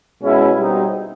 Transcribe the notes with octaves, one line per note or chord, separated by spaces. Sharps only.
B2 G#3 C#4 E4
B2 G3 C4 D#4